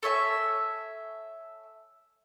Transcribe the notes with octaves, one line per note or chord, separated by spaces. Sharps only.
A4 C#5 E5 G#5